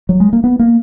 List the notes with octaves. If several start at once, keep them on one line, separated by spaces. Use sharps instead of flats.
F#3
G#3
A#3
B3
A#3